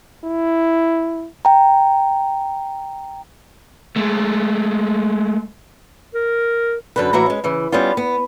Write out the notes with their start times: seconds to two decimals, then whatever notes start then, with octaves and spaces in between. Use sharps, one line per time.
0.24 E4
1.45 G5 A#5
3.96 G#3 A3
6.14 A#4
6.96 F#2 D3 B4
7.13 A2 E3 E4 F#4 A#5
7.26 G#3 C#4
7.44 C#3 E3
7.72 G3 B3 C#4 F4
7.97 B3